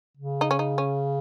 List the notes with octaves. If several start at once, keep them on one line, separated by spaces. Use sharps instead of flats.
C#3
D#4
C#4
D#4
C#4